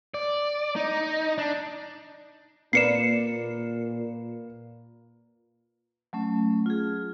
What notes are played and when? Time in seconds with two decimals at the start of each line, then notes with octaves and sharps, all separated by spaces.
0.14 D5
0.76 D#4
1.38 D4
2.73 A#2 A#3 B4 D5 C7 C#7 E7
6.13 F#3 A3 C#4
6.66 F4 G#4